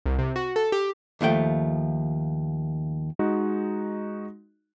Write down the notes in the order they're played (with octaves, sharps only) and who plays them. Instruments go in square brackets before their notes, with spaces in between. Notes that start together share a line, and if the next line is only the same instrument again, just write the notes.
[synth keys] C2
C3
F#4
A4
G4
[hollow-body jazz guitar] D#2 F3 A3 G5
[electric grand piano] G#3 D#4 F#4